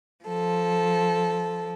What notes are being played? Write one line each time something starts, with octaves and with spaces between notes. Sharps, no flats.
F3 A4